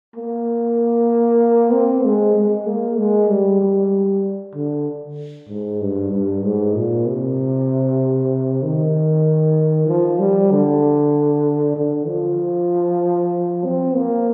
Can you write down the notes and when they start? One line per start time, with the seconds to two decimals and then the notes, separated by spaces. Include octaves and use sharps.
0.16 A#3
1.72 C4
2.04 G#3
2.35 G#3
2.67 A#3
2.98 G#3
3.29 G3
3.61 G3
4.55 D3
5.48 G#2
5.81 G2
6.12 G2
6.43 G#2
6.74 A#2
7.06 C3
8.62 D#3
9.87 F3
10.19 G3
10.51 D3
11.76 D3
12.07 F3
13.65 C4
13.96 A#3